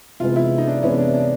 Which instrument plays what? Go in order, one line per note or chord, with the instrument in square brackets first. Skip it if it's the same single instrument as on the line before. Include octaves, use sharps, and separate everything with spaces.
[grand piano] C3 E3 G#3 B3 [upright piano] F4
[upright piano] E4
D#4
D4
[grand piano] C3 E3 G#3 B3 [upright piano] C#4
[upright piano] D4
D4